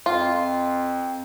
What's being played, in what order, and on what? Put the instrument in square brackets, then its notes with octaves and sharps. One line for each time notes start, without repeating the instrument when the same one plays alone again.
[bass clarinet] F2 [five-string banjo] F4